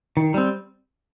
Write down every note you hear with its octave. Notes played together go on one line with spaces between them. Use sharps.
D#3
G3 C4